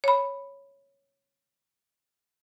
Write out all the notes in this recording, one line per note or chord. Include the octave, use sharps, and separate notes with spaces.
C#5 B5